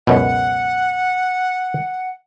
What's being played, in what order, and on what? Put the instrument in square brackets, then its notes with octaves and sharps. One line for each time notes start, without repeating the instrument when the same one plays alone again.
[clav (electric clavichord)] C#2 F#2 B2 [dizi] F#5